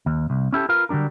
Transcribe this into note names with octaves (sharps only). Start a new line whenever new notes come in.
D#2
C2
C#4 E4 G4 A4
F4 A#4 B4 F5
D3 F#3 G3 D4 A#4